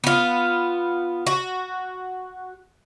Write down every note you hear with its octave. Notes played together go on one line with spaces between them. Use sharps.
B3 F4
F#4